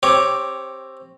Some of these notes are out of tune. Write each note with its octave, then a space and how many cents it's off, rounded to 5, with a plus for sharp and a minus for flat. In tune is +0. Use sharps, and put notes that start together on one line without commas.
C4 +15 G4 +0 C#5 +0